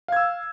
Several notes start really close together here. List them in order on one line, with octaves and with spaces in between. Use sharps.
F5 G#6 E6